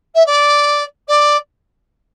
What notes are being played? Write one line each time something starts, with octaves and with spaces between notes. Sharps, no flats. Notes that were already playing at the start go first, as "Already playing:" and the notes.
E5
D5
D5